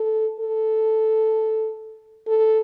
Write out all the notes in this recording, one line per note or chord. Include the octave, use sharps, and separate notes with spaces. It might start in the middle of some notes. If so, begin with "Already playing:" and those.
Already playing: A4
A4
A4